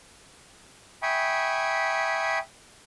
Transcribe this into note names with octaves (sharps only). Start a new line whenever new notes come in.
E5 G5 G#5 B5 C#6 D#6